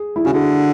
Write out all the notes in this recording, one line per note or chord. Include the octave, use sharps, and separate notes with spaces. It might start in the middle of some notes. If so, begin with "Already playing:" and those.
Already playing: G#4
E4
C#3 F#4
D3 G#4